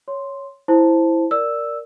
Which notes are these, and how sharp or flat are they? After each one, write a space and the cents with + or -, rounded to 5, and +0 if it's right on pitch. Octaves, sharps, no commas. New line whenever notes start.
C#5 +0 C6 +0
E4 +0 C5 +0 A5 +0
A#4 +0 D5 +0 E6 +0